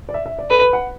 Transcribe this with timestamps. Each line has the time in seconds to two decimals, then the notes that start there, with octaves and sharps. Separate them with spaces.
0.09 D5
0.14 E5
0.26 E5
0.39 D5
0.50 A4 B4
0.61 B4
0.73 F#5